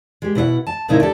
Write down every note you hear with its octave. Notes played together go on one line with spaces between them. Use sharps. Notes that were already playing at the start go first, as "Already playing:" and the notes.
G#3 G4
B2 E4 C5 F#5
A5
A#2 C#3 C4 D#4 E4 A#4
D4 G4 A4